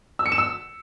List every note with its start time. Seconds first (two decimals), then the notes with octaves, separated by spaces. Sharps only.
0.19 E6
0.26 C#7
0.32 E7
0.38 E6